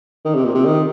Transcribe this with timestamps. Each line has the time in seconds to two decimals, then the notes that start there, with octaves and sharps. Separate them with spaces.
0.25 D#3
0.35 C3
0.45 A#2
0.55 C3
0.65 D#3